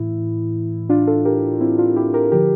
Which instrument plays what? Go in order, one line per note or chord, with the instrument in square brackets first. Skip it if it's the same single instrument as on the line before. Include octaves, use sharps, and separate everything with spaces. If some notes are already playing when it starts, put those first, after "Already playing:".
Already playing: [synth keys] A2 E3 E4
D4 F4
F4 A4
G4 A#4
C4 E4
D4 F4
E4 G4
G4 A#4
D3 F3 G4 A#4